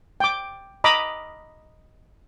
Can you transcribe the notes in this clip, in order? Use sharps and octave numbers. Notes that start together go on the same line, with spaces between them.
G5 D6
D#5 A#5 B5 D6